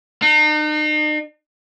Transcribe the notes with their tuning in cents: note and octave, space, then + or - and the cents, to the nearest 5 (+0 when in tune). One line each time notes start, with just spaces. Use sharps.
D#4 -40